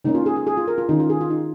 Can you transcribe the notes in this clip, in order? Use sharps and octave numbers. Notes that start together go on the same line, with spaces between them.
C#3 A#3 C#4 D#4
F4
G#4
G#4
G#4
F4
A#4
F4
D#3 C#4 D#4
F4
G#4
F4
D#4